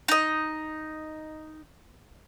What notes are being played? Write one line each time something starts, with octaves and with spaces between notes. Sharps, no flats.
D#4 D#5